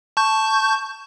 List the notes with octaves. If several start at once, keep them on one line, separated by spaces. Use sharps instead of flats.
A5 C#6 G6